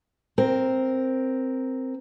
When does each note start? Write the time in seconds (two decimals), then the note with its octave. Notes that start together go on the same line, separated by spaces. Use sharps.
0.38 C4 A#4